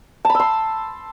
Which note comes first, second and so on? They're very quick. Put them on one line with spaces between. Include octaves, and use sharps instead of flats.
A5 B5 E6 C6